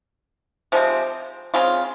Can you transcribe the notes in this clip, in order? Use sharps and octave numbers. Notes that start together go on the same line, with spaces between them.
C3 F3 G#3 C4
C#3 G#3 C4 F4